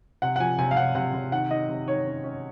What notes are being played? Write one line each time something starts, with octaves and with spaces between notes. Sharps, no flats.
C3 F#5
F#5
F3 G#5
C3 G#5
F5
C3 F#5
C3 F#5
C3
D#3 F#5
D#3 D#5
C3
D#3 C#5
C#4
C#4